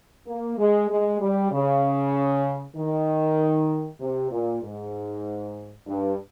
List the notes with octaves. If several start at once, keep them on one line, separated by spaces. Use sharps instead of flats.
A#3
G#3
G#3
G3
C#3
D#3
C3
A#2
G#2
G2